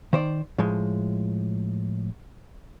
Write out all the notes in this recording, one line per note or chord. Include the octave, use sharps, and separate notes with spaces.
D#3 C5 D5
A2 F3 G#3